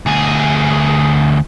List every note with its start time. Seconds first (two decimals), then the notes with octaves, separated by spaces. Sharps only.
0.06 D2 G#4